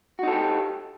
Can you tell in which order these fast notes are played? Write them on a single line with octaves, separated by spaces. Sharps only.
F#4 D#4 A4 G4